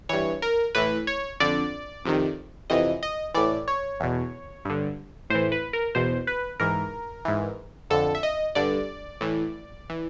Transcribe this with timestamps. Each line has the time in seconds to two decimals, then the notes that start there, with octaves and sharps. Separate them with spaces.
0.09 G2 E3 C#5
0.42 A#4
0.75 A2 E3 B4
1.07 C#5
1.40 F2 D3 D5
2.05 F2 C3 D#3
2.70 F2 C3 E3 D#5
3.03 D#5
3.34 A2 E3 D5
3.68 C#5
4.00 E2 B2
4.65 G2 D3
5.30 A2 E3 C5
5.52 B4
5.73 A#4
5.95 E2 B2 C5
6.27 B4
6.60 G#2 E3 A#4
7.25 G#2 E3
7.90 F2 D3 A4
8.15 E5
8.23 D#5
8.55 G2 D3 D5
9.21 A2 E3
9.90 E3